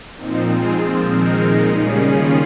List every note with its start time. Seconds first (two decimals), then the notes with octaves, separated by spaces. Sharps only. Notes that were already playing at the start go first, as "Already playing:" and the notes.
0.15 A#2 F3 C4 D#4
0.47 G#3 C4 F4 G#4
0.78 A#2 F3 C4
1.09 D#3 G#3 C4 D#4 A#4
1.41 A#2 G#3 D#4
1.72 C#3 G3 A#3 C#4 G#4
2.03 D#3 G3 C#4 F4 G#4